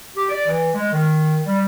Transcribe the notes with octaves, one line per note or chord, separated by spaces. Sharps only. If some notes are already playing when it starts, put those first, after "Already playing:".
G4
D5
E3
G#3
D#3
G3